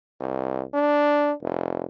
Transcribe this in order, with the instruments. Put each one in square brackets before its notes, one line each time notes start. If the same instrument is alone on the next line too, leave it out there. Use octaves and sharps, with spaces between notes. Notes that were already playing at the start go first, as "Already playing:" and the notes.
[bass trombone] C2
D4
F1